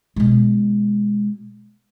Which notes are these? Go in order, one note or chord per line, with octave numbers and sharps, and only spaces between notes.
B2 G#3